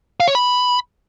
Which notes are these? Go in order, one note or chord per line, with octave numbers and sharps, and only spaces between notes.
F5
C#5
B5